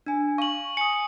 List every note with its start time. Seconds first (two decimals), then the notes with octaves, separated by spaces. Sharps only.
0.06 D4 G#5
0.38 F5 C#6 F#7
0.77 G#5 D#6 C#7